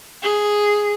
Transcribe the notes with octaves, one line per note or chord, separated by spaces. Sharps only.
G#4